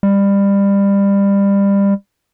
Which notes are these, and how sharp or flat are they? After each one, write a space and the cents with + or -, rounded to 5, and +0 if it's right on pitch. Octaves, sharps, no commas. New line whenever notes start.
G3 +25